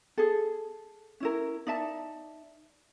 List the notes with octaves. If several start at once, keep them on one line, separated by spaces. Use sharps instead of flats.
G#4 A4
C#4 E4 A#4
D#4 D5 E5 A5